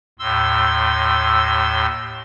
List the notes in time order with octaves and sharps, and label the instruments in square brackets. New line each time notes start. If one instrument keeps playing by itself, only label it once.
[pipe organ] D#2 A2 C6 E6